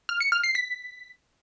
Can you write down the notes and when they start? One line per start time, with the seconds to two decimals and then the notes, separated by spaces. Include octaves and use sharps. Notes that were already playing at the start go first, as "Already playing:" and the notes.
0.09 F6
0.21 C#7
0.32 F6
0.44 C7
0.55 B6